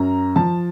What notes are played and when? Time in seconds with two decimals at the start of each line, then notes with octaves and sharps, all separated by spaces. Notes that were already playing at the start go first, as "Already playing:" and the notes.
Already playing: F#2 A#5
0.36 F3 A5